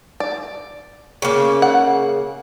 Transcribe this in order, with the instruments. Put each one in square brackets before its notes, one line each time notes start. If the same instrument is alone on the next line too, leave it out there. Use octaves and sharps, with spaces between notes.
[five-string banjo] D5
[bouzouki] C#3 A#3
[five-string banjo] F#5